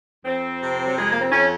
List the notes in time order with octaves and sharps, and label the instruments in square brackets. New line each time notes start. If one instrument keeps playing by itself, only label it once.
[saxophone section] F2 C4
C3
F#3
F2 G#3
A#3
C4
F2 C#4